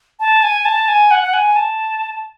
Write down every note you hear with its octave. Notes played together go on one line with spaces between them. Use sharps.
A5
G#5
A5
G#5
F#5
F#5
G#5
A5